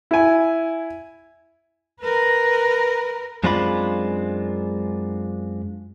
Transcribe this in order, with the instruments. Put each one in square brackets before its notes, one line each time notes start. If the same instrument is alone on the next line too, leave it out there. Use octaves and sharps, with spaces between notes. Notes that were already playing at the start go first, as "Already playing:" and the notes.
[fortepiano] E4 G#5
[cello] A#4 B4
[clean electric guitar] F#2 G#3 C4 D4 F4 B5